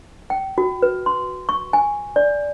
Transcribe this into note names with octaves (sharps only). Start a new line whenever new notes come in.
G5
F#4
B4
C6
C#6
G#5
D5